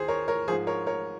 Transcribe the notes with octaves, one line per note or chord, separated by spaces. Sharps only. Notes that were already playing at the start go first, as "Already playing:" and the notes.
Already playing: D#2 G#4 C5
A#4 C#5
A#4 C#5
G#2 F3 G#4 C5
A#4 C#5
A#4 C#5